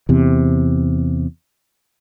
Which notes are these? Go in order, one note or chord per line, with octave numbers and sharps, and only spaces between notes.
E2 C3